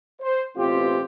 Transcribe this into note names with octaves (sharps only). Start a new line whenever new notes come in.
C5
A1 B2 C4 F4 G4